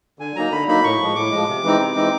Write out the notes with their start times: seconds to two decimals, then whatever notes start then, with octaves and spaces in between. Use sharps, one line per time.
0.19 D3 G#5
0.35 F#3 A#3 D#4 A#5
0.51 D3 B5
0.67 F#3 A#3 D#4 B5
0.84 A2 C#6
1.00 F3 G#3
1.15 A2 D6
1.31 F3 G#3
1.48 C3
1.63 E3 G#3 C4 D#4
1.79 C3
1.95 E3 G#3 C4 D#4